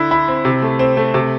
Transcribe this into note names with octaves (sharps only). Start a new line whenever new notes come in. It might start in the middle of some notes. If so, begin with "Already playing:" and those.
Already playing: D3 E4
E4
C4
C3
A3
C4
A3
C3